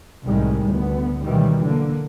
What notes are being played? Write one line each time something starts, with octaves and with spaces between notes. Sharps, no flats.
C2 A2 C3 D#3 G3 G#3
D2 B3
B2 D#3 E3 F#3 G3
D3 A#3